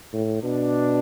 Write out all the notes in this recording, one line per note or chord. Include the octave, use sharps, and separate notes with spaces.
A2
B2 D4